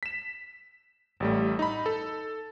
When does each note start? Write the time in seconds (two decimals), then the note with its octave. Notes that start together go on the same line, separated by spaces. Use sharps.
0.03 B6 E7
1.20 A1 G3 A3
1.59 D#4 B5
1.86 A4